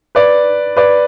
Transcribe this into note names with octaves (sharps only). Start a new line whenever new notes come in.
B4 D5
B4 D5